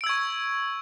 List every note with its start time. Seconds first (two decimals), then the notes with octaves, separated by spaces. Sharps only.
0.01 D7
0.04 E6
0.06 G#6
0.09 C#6